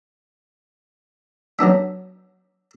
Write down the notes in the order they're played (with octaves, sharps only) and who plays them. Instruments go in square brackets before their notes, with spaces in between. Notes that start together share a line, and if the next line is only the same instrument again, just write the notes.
[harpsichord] F#3 B3 D4 E5